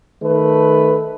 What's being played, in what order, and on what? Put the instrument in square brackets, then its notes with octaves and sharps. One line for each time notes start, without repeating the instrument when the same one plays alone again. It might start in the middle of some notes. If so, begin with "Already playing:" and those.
[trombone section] D#3 A3 B4